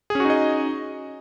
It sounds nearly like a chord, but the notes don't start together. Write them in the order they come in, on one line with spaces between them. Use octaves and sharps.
G#4 C#4 F#4 D#4 D#5